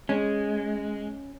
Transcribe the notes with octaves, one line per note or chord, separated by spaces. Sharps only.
G#3 C#4